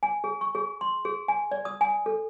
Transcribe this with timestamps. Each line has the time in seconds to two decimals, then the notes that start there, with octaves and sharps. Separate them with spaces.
0.03 G#5
0.24 G#4
0.41 C#6
0.55 G#4
0.81 C6
1.05 G#4
1.28 G#5
1.51 D5
1.65 D#6
1.81 G#5
2.06 A4